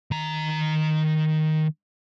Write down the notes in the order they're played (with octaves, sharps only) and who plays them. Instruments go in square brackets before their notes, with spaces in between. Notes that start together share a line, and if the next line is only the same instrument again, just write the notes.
[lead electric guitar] D#3 A#5